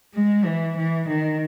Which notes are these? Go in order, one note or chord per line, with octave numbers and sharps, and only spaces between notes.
G#3
E3
E3
D#3